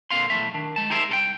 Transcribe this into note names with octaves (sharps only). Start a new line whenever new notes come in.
A#2 D3 C4 F5 C6
B1 E2 A2 D#3 A3 E5
D#3 D4
G#3 A5
D#4 G4 G#4 A#4 C5 E5
C2 A4 G5